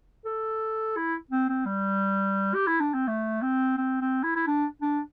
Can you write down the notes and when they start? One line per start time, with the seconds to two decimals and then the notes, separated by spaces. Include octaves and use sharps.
0.25 A4
0.96 E4
1.31 C4
1.49 C4
1.65 G3
2.54 G4
2.67 E4
2.80 D4
2.94 C4
3.07 A3
3.41 C4
3.77 C4
4.01 C4
4.23 E4
4.36 E4
4.47 D4
4.82 D4